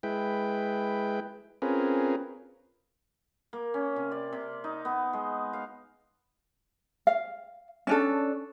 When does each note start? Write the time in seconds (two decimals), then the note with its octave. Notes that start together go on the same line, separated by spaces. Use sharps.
0.03 G#3 E4 B4 G5
1.62 C4 C#4 F4 G#4 A#4 B4
3.53 A#3
3.74 C#4
3.96 C3
4.12 D5
4.33 C3
4.64 D#4
4.85 B3
5.13 G#3
5.53 F5
7.07 F5
7.87 C#4 D4 A4